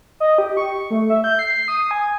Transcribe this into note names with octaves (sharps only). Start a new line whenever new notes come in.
D#5
G4
C#6
A3
E5
G6
C7
D#6
G#5